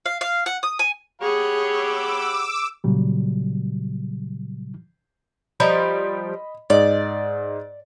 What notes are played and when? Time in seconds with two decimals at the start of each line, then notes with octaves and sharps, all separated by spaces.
0.06 F5
0.21 F5
0.46 F#5
0.63 D#6
0.79 G#5
1.22 G4 G#4 C#5 F#5 B5
1.66 D6 E6
2.84 A#2 C#3 F#3 G3
5.60 F3 G3 D#5 A#5 B5
6.70 G#2 D5 D#5